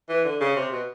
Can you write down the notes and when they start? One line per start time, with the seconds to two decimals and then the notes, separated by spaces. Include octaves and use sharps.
0.09 E3
0.25 D3
0.40 C#3
0.56 C3
0.71 B2